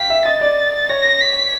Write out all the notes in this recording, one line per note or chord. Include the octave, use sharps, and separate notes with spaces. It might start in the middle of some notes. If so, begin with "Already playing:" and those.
Already playing: F5 G5 B6
E5
D#5 A6
D5
C#5 A#6
B6